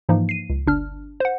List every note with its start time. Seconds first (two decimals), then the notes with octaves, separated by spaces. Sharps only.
0.09 G#2 E3 F3 A#3 D#4
0.29 C7 D#7
0.50 C#2
0.67 G1 D4 F6
1.20 C5 F#5